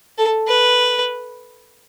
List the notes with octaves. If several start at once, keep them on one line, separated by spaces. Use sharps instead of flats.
A4
B4